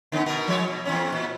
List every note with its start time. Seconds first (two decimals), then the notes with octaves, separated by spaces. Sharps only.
0.12 D3 B3 C#4
0.26 B2 B3 A#4
0.48 F3 G#3 C#5
0.68 B2
0.85 E2 C4 C#4
1.12 A#2